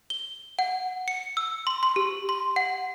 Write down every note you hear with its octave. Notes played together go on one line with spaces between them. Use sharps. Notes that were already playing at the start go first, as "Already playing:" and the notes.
G7
F#5
C#7
E6
C6
C6
G4
C6
F#5